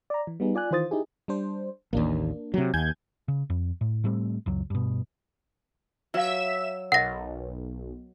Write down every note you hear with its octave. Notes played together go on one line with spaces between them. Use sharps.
D5 A#5
E3
G3 B3 D#4 G#4
F4 D5 G#5 F#6
D#3 E3 F4 C5 D#6 A6
D#4 E4 G4 G#4
G3 D4 C5
A1 D#2 A#3 D4
C3 F#3
D#2 G#5 G6 G#6
C#3
F2
A2
A2 G3 A3 C4
F#1 C#2 F#3
G2 B2
F#3 B4 E5 F5 E6 E7
B1 A#4 D#5 F#5 A#6